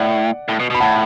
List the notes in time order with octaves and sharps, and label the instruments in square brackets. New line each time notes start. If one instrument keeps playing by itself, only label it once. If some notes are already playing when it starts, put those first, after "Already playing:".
Already playing: [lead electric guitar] A2 [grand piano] D5 F#5
[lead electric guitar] A2
B2
B2
[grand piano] B5
[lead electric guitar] A2 [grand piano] F#5 A5